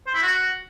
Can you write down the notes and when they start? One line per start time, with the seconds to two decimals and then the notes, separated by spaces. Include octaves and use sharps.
0.07 C5
0.14 E4
0.22 F#4